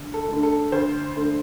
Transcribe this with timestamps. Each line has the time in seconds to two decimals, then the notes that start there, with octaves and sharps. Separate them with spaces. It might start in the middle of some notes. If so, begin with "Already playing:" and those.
Already playing: D2
0.14 A4
0.28 D3 A3
0.43 A4
0.72 D2 C5
1.16 D3 A3